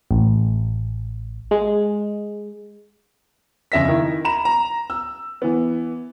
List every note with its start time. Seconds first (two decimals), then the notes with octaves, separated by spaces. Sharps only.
0.11 A1
1.51 G#3
3.72 F2 C#3 E5 A#6 B6
3.88 D#3 E4
4.25 A#5 B5 E7
4.45 A#5
4.90 E6
5.42 E3 B3